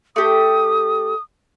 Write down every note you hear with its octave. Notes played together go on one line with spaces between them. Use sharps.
A3 G4 D#6